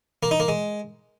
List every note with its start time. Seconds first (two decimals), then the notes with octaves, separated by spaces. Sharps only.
0.23 A#3
0.31 D#4
0.40 A#3
0.48 G#3